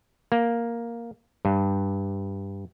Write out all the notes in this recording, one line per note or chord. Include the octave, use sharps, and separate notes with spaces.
A#3
G2